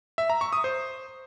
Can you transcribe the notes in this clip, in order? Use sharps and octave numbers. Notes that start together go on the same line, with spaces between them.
E5
A#5
C#6
D#6
C5